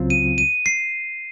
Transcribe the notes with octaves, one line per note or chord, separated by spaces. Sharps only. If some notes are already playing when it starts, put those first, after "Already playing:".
Already playing: C#2 C#3 F#3 C4 F4
D#7
D#7
C7